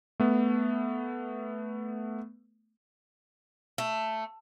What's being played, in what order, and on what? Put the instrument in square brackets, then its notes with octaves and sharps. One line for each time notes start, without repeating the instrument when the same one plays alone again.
[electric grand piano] A3 B3
[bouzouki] A3